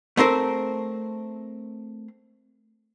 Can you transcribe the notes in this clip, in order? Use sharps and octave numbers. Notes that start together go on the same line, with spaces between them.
A3 C4 A#4 C5